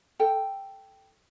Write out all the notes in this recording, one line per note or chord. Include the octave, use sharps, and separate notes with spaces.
A4 G5